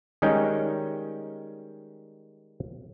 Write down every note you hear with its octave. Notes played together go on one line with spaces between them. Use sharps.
D#3 G3 G#3 C#4 D#4 G5